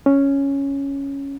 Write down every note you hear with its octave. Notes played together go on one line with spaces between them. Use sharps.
C#4